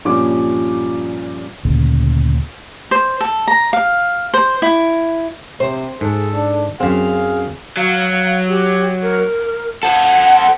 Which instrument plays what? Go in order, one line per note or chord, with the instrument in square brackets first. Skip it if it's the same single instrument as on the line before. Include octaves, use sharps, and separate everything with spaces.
[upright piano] G2 A#2 F3 G3 C#4 D6
[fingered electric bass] D2 A#2 C#3
[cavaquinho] C5
A4
A#5
F5
C5
E4
[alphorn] C3 [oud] C5
[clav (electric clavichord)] G#2 [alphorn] G#4 [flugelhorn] A4
[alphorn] D4
[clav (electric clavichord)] F#2 C4 [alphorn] G#4 [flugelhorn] F5
[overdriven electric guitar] F#3 [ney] F5
[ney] G4
A#4
[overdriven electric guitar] A4 C5 [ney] F#5